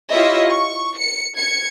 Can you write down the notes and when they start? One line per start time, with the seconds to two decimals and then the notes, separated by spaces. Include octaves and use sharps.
0.11 E4 F4 G4 C#5 D#5 E5
0.50 C#6
0.97 C#7
1.36 G#6 C#7